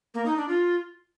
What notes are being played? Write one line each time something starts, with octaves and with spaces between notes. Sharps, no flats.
A#3
D#4
D4
F4